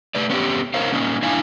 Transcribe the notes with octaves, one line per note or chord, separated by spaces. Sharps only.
A3 B4 D5
B3 C#4 E4 G4
D#4 A#4 C5 C#5 F5
A#3 C#4 D#4
D4 E4 F5 G#5